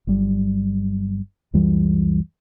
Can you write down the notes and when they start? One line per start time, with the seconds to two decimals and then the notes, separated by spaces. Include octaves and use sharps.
0.07 G1 F#3 G3
1.54 C#2 F#2 E3 G3